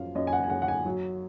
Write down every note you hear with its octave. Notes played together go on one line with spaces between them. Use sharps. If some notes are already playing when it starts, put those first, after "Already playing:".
Already playing: F#2 F3 F5
F#2 D#5
G#5
F#5
G#5
F#2 F#5
F#5
G#5
F#3